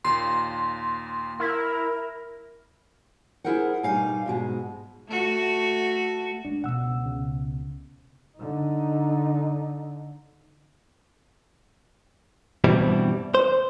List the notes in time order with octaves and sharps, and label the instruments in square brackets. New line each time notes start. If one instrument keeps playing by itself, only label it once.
[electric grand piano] D#2 A#2 [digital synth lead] C6
[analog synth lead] E4 [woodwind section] A#4
[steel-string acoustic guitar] E4 G#4 A#4 C5 F#5
B2 G3 D#4 F5 G#5
G#2 B2 G#3
[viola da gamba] A3 F#4
[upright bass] G#2 [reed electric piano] D4
[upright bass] C#2 B2 [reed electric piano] F#5 E6
[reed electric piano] C#3
[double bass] D3 D#4
[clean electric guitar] G2 B2 E3 G3 C4 E4
C5